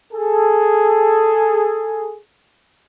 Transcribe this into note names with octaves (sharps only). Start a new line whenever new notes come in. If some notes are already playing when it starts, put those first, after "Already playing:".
G#4 A4